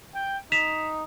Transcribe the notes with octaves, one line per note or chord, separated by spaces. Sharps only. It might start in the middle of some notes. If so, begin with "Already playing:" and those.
G5
D#4 B6 E7 F7